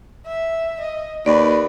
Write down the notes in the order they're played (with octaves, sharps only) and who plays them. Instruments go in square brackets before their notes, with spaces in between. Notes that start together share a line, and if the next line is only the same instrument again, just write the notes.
[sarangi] E5
D#5
[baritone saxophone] D#2 [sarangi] B4 [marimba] D5